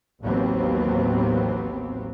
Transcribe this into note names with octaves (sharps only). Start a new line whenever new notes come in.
A1 D#2 F#3 B3 C4